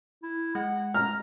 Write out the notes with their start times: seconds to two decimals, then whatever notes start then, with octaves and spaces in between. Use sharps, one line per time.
0.23 E4
0.55 G#3 F#5
0.94 A#5 F6